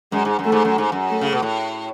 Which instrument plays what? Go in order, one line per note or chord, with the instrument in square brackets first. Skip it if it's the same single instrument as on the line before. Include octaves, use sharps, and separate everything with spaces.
[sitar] F#2 [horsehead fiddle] G#3
[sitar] G#2
F#2
[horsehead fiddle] A3
[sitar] G#2
F#2
G#2
F#2
[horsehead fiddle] A3
[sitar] C#3
B2
A2